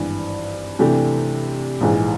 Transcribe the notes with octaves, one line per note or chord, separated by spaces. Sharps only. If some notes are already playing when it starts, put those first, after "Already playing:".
Already playing: G#1 G2 E3
C3 E3 A3 D4 G4
A#1 G#2 E3